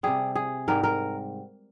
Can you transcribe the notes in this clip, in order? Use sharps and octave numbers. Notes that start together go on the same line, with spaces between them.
C3 G3 G#4
G#4
G#2 G3 A#4
A#4